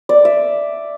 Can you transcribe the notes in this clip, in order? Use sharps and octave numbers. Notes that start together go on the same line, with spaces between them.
D5
E5